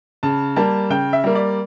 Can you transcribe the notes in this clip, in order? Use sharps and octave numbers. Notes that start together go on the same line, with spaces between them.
C#3 A5
G3 A#3 A5
C#3 G5
E5
G3 A#3
D5